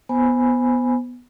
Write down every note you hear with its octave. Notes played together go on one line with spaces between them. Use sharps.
B3 C5 G#5 B5